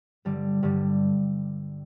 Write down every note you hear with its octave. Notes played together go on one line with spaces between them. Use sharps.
G2 D3 G3
G2 D3 G3